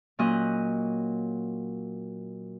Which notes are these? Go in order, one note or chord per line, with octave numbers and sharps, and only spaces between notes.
A#2 F#3 C#4 D#5 F#6 G6